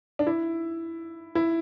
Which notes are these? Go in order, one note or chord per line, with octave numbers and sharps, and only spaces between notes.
D4
E4
E4